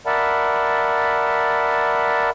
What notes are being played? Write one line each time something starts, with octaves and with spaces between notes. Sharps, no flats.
A#4 D5 E5 F#5 A5 B5